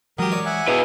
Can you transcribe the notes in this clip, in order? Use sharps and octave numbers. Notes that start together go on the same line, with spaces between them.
E3 F#3 G#3 G4 A#4 D#6
C#5 D5
E5 F#5 G#5
B2 E4 G#4 B4 F5